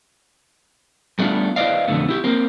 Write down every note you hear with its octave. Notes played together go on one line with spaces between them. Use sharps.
G3 A3 B3 D4 F4
E4 B4 C5 D5 D#5 F5
F2 B2 D3 A3 B3
E4 G4
A#3 C4